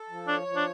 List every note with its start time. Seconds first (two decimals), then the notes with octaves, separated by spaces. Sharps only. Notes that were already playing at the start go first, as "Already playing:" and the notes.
Already playing: A4
0.09 F3
0.28 D4 C#5
0.47 F3
0.56 D4